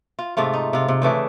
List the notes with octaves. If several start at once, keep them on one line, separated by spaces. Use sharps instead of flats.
F4
G#2 C3 A3 F4
D#4
C3 F4
C3
C#3 E3 A3 D4